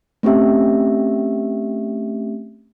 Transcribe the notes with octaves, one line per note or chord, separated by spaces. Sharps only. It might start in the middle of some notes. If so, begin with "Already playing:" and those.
A3 C4 C#4 G4 E5